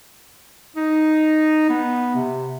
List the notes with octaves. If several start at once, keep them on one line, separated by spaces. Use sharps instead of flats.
D#4
B3
C3